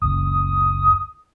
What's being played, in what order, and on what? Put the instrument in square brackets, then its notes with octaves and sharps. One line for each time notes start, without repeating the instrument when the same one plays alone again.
[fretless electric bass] F#1 C#2 [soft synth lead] D#6